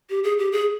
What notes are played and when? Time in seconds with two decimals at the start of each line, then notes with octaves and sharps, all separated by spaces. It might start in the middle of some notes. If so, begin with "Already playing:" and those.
0.10 G4
0.24 G#4
0.39 G4
0.52 G#4